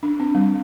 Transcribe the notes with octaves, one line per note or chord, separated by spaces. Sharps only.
D4
C4
G3